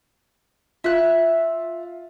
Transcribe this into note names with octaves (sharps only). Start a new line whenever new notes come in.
F4 E5 F#6